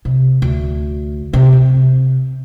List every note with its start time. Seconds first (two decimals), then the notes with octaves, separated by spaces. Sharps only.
0.05 C3
0.42 D2
1.33 C3
1.53 C3